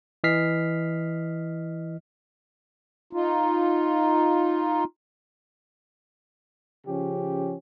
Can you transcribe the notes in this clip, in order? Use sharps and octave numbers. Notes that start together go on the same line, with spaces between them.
E3 D#5 F6 B6 C7
D#4 F4
C#3 F3 C#4 G4